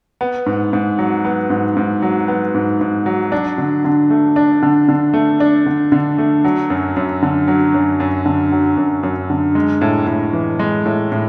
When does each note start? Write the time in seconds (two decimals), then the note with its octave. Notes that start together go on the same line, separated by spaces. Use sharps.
0.21 B3
0.46 G#2
0.73 G#2
0.99 F#3
1.25 B3
1.50 G#2
1.77 G#2
2.02 F#3
2.28 B3
2.54 G#2
2.81 G#2
3.06 F#3
3.32 D4
3.58 D3
3.85 D3
4.10 A3
4.36 D4
4.62 D3
4.88 D3
5.14 A3
5.40 D4
5.66 D3
5.92 D3
6.18 A3
6.44 F#3
6.70 F#2
6.96 F#2
7.22 D3
7.48 F#3
7.74 F#2
8.00 F#2
8.26 D3
8.52 F#3
8.77 F#2
9.03 F#2
9.30 D3
9.55 G#3
9.81 A2
10.07 A2
10.33 E3
10.59 G#3
10.86 A2
11.12 A2